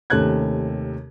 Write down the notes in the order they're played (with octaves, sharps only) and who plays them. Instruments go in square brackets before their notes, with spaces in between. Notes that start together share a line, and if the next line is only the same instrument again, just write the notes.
[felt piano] D#2 C3 A3 C#4 F#6 G#6